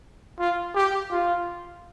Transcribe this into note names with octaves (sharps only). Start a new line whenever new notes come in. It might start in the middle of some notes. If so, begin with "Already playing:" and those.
F4
G4
F4